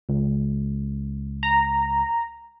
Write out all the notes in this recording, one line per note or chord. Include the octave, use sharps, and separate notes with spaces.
C#2
A#5